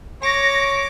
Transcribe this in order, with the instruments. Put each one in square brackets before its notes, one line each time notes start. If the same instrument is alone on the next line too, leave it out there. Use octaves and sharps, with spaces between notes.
[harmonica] C#5 [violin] D6 [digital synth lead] A#6